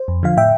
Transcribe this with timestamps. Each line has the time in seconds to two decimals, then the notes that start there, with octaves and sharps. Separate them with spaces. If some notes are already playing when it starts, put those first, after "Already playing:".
Already playing: C5
0.08 F2
0.23 D3 F3 F5
0.37 A2 E5 G5